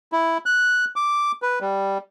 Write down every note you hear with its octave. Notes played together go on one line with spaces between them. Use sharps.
E4
F#6
D6
B4
G3